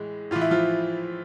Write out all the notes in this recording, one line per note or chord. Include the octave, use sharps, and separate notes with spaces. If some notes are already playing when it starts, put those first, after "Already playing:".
Already playing: A2 E3 G#3
A2 E3 F4
E4
F3 F4